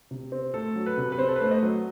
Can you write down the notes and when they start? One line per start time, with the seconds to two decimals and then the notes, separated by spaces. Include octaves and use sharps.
0.11 C3
0.32 C4
0.54 A3 A4
0.76 F#3
0.86 B4
0.97 C3
1.12 B4
1.18 C4 C5
1.28 A4
1.36 B4
1.41 A3 C5
1.51 D#5
1.63 F#3